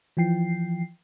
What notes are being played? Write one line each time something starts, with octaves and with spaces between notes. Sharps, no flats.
E3 F3 G5 C7